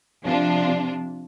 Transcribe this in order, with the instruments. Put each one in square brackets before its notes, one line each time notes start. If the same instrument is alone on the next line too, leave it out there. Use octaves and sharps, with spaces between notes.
[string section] C3 F3 D4 F4